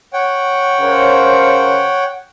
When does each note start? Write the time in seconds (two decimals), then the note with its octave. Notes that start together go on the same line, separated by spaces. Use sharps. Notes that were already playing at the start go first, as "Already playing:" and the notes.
0.13 C#5 F#5 G5
0.81 C#3 A#4 C5